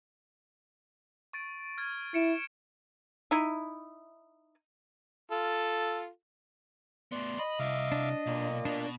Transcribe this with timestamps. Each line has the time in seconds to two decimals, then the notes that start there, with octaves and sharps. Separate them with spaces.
1.33 C#6 A6 D7
1.78 F6 G#6 A6
2.14 E4 C#7 D7 E7
3.31 D#4 E4
5.31 F4 A4
7.12 A2 B3 D5 C6
7.39 D#5 B5
7.59 C2 E5 F5 D6
7.92 D4
8.26 B1 A#2 A#3
8.65 B2 D4